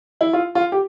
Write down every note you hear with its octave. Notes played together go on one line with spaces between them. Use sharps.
E4
F4
F4
G4